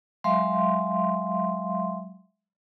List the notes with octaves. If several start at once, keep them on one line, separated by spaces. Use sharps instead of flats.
F#3 G#3 E5 F5 C6